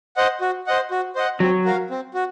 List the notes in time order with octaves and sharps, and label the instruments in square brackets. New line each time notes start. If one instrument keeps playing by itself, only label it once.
[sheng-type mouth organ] C5 D#5 F#5
F#4
C5 D#5 F#5
F#4
C5 D#5 F#5
[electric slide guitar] F#3 [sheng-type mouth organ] C4
[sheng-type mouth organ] F#4 A#4 F5
C4
F#4